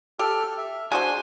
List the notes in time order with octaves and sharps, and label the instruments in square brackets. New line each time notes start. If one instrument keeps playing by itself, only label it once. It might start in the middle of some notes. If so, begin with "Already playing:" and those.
[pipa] G4 [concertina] A4 F6
[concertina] E5
[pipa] G#3 F#4 C5 [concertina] D4 [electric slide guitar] G#5